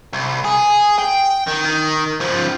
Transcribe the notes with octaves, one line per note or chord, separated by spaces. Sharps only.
C2
G#4
G5
D#3
D#3
C#2 F3